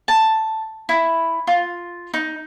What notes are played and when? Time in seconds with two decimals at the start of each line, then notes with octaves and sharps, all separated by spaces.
0.08 A5
0.89 E4
1.47 F4
2.14 D#4